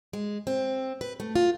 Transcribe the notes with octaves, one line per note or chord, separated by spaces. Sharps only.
G#3
C4
B4
A3
F4